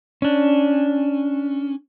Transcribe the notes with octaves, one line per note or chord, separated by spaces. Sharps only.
C#4 D4